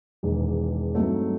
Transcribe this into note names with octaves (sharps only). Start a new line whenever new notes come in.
E1 E2 D#3
G2 F#3 A3 C4 D#4